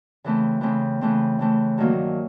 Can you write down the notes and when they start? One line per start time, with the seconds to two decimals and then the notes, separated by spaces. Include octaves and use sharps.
0.24 C#3 E3 A3 C4
0.61 C#3 E3 A3 C4
1.01 C#3 E3 A3 C4
1.39 C#3 E3 A3 C4
1.78 G2 D#3 F#3 A#3